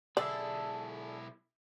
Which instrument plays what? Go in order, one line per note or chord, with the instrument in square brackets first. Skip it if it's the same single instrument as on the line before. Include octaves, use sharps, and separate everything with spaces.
[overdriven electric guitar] B1 E4 [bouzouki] D3 G#4 A4 [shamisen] D5